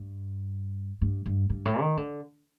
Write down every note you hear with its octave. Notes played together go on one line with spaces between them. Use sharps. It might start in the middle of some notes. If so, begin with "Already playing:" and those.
Already playing: G2
G2
G2
G2
A2
D#3
D3